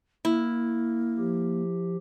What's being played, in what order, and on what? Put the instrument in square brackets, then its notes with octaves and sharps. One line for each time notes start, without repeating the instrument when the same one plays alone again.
[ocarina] A#3 [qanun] E4
[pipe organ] F3 G4